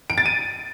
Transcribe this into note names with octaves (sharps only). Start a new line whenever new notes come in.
D7
A6
D#7